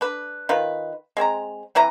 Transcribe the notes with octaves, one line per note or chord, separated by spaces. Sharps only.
D4 B4
D#3 F4 B4
G#3 C4 C#5 A#5
C3 E3 E4 A#5